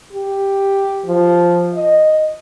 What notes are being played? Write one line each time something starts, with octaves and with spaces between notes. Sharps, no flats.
G4
F3
D#5